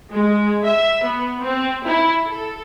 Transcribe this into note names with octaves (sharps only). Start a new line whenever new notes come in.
G#3
E5
B3
C4
E4
A4